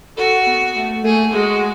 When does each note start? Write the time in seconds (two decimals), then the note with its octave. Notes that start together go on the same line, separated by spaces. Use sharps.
0.17 F#4 A4
0.46 B3
0.76 A3
1.03 A3 G#4
1.32 G#3 F#4